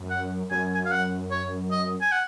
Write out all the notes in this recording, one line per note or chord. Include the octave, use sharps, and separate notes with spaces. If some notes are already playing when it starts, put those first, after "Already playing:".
Already playing: F#2
F#5
F#2 G#5
G#5
F5
F#5
C#5
D#5
G#5
F#5